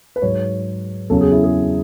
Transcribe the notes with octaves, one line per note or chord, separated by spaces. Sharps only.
B4
G#2 F#3 C#5
E2 C#3 F#3 A4
G#4
E4
G#4